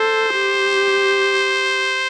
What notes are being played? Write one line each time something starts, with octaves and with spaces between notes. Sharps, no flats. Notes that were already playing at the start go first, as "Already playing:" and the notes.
Already playing: A4 C5
G4